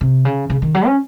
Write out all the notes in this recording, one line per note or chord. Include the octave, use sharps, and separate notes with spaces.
C3
C#3
C#3
D#3
F#3
C#4